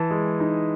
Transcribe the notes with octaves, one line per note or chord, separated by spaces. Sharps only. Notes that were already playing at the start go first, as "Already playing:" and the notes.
Already playing: E3 A5
G#3
D#4